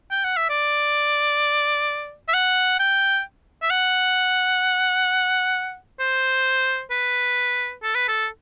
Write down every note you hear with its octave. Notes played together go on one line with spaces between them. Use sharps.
G5
F#5
E5
D5
E5
F#5
G5
E5
F#5
C5
B4
A4
B4
A4